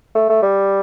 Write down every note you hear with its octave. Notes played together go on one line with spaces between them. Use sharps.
A3
A3
G3